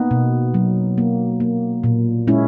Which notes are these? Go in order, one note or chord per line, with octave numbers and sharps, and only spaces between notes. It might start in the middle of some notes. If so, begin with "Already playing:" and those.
Already playing: A#3 B3 D#4
B2
F#3
A#3
A#3
A#2
G#3 C#4 E4